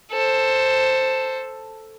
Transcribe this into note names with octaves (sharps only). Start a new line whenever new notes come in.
A4 C5